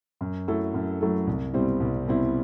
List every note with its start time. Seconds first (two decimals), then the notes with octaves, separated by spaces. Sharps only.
0.21 F#2
0.48 F#3 A3 E4 A4
0.74 F#2
1.01 F#3 A3 E4 A4
1.27 C2
1.54 B2 G3 C4 E4
1.80 C2
2.07 B2 G3 C4 E4